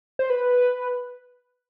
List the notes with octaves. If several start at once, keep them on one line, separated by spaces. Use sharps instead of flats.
C5
B4